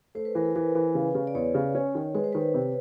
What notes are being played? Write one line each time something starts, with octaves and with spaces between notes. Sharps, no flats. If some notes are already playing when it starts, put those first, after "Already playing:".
A3 C5
B4
E3 A#4
A4
E3 B4
E3
C#3
C#3
D5
E2 C#5
C#3
C#4
D#3
G#3 B4
C5
D#3 B4
C3